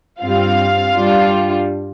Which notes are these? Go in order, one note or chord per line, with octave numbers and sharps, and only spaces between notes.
G2 G3 C4 F4 F5
G2 G3 D4 F4